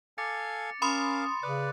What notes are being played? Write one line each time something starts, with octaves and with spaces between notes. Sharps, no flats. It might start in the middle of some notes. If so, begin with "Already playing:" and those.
A4 F5 G#5 D6 A6 C#7
C#4 A#4 F5 B5 C6 D#6
C#3 B4 D5 F#6